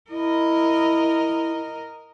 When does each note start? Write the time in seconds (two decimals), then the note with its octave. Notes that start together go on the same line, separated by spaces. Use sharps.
0.10 E4 A#4 D#5